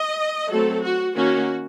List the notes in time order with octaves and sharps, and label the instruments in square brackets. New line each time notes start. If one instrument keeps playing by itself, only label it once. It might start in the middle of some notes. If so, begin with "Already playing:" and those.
Already playing: [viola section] D#5
F#3 A3 C4 A4
F#4
D#3 A#3 C#4 F#4